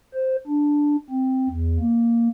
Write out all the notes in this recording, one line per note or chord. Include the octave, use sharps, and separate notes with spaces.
C5
D4
C4
E2
A#3